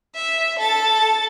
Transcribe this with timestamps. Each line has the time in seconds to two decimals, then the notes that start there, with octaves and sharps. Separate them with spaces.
0.15 E5
0.60 A4 A6